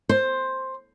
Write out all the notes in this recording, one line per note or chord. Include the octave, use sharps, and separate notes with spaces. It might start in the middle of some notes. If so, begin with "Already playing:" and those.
C5